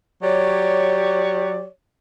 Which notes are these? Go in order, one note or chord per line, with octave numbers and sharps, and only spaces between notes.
F#3 G4 C#5 D5